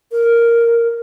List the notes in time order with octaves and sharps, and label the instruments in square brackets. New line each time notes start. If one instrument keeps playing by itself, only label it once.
[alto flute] A#4